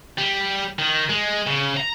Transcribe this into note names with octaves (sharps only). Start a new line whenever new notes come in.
G3
D#3
G#3
C#3
A#5